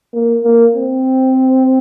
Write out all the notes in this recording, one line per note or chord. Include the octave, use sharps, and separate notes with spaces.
A#3
A#3
C4